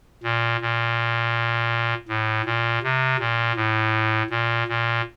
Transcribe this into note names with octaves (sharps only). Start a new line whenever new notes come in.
A#2
A#2
A2
A#2
C3
A#2
A2
A#2
A#2